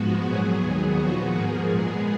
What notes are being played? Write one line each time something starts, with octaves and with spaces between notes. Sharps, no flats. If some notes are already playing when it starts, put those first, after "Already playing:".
Already playing: G#2 F3 G#3 B3 F#4
A#2 F#3 B3 G#4
D#2 D#3 F#3 B3
A#2 F3 B3 F#4
G#2 F3 A#3 G#4
A#2 G#3 B3 G#4